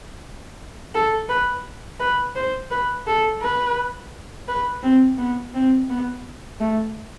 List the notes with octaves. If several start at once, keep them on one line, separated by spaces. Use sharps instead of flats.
A4
B4
B4
C5
B4
A4
B4
B4
C4
B3
C4
B3
A3